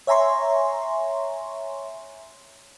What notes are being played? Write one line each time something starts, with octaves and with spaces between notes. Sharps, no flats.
C#5 E5 G#5 A#5 C6 C#6